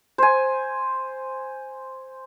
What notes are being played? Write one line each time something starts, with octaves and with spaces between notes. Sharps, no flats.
C5 G#5